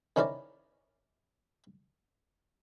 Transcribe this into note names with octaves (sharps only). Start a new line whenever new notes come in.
D#3 C#4 E4 A#4 C5 D5